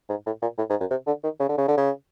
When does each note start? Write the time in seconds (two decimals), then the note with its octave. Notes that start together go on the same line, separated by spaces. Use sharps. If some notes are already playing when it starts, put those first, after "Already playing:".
0.10 G#2
0.26 A2
0.42 A#2
0.58 A2
0.70 G#2
0.80 F#2
0.91 C3
1.07 D3
1.24 D#3
1.40 C#3
1.49 D3
1.58 C#3
1.68 D3
1.77 C#3